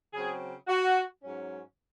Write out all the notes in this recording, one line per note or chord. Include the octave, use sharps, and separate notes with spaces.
C#3 F#3 C4 G#4
F#4
G#2 F#3 C#4